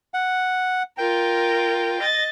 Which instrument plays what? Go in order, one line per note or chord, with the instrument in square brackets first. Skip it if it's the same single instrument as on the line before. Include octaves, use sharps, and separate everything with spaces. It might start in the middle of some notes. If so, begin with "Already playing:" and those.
[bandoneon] F#5
[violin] F4 A#4 [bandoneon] G5
[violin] D#5 A6